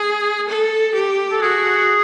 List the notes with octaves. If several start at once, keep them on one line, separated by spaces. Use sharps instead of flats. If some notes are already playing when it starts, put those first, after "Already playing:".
Already playing: G#4
A4
G4
A4
F#4 G#4